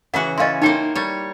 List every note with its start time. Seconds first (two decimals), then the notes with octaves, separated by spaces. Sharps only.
0.14 C#3 E3 F#4 F#5
0.38 C#4 E4 D#5 F5 C6
0.62 A#3 D#4 C5 C#5 G5
0.95 G3 C#5